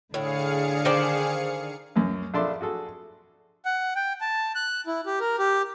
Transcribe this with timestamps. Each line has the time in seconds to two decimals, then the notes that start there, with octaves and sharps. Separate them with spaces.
0.14 A2 D3 D4 G#4 F5 C#7
0.85 D#3 C5 D5
1.96 C#2 F#2
2.34 A#1 D4 A4 D5 E5 C6
2.61 F#4 G#4 A4
3.65 F#5
3.96 G5
4.21 A5
4.55 F#6
4.87 E4
5.06 G4
5.20 A#4
5.38 G4